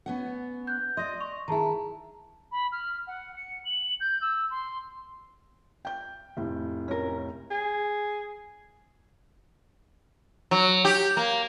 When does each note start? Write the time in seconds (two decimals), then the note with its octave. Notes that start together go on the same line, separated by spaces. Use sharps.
0.06 B3 C#4 F#5
0.67 F#6 G6
0.97 D5 D#5 C6 A#6
1.20 C#6 F7
1.48 D#3 E4 G#4 A5 A#5
2.52 B5
2.72 F6
3.07 F#5
3.36 C#7
3.65 F#7
4.00 G6
4.21 E6
4.51 C6
5.85 G5 G6
6.37 F1 A2
6.88 C#4 A#4
7.51 G#4
10.51 F#3
10.85 G4
11.17 A#3